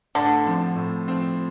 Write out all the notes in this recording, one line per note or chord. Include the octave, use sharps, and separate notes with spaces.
A2 D3
F3 C4
A2
F3 C4